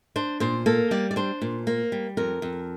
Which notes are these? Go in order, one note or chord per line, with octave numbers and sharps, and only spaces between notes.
D4 C5
A#2 C5
A#3 A4
G3 D5
D5
D4 C5
A#2
A#3
G3
F2 A#4
F2